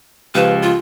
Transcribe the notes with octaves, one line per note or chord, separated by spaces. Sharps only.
C#2 F3 G4 B4 F5 E7
F4